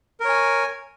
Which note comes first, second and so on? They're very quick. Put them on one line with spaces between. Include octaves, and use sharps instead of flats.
A#4 C#5 G#5